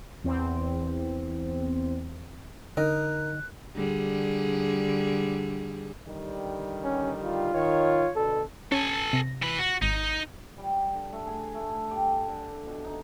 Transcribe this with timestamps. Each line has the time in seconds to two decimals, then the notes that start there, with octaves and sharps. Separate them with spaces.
0.24 E2 C4
2.77 D3 D#4 A#4 F#6
3.75 D3 G3 G#4
6.08 D3 D#3 G3
6.84 C#4
7.23 F4
7.54 D#3 C#5
8.16 B2 D3 A4
8.72 C#4 A4 G#5 A5
9.13 C3 A#6
9.42 E3 B4
9.59 F#4
9.82 G#1 D#4
10.58 G3
10.93 D3
11.13 A3
11.27 G#4
11.54 A3
11.91 G4
12.28 D3
12.66 B2
12.84 D#4